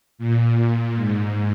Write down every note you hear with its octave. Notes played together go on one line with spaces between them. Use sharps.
A#2
G#2